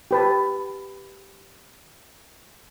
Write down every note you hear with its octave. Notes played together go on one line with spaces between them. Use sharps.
G4 B4 A5